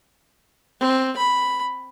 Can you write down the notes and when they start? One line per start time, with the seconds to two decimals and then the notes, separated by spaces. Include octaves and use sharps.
0.80 C4
1.17 B5